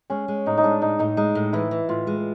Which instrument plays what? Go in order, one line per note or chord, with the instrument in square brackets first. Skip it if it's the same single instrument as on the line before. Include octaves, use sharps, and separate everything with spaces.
[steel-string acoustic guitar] G#3 [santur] C#4
[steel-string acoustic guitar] G#3
[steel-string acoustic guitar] A2 [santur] D#4
[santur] D#4
[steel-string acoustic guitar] G#3 [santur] D4
[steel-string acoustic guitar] A2 [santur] D#4
[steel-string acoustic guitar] A2 [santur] D#4
[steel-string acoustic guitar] G#3 [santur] D#4
[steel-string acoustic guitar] A2
[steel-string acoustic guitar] E3 [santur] E4
[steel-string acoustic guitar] E3
[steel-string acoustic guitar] A2 [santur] F4
[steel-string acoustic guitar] G#3